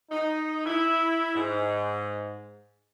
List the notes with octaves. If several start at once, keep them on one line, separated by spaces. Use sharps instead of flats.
D#4
E4
G#2